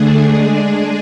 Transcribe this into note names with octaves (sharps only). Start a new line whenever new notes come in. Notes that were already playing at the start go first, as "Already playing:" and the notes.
Already playing: D3 A3 D4 G#4
G#3 D4 G#4